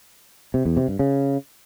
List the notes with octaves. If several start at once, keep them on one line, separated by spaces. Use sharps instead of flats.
C3
E2
C3
G2
C#3